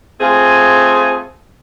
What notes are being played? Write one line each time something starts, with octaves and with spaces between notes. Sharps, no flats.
A3 C4 F4 G#4